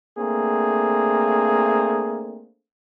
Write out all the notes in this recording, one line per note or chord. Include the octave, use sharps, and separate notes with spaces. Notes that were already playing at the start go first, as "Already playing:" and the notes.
A3 A#3 C4 D4 G#4